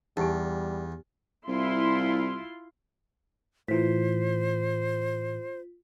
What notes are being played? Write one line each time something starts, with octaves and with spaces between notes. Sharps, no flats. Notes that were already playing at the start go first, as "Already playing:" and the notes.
E2 G3 D#4 G4 G#5
C2 E4 F4 C6
A2 E3 F4 C5 B6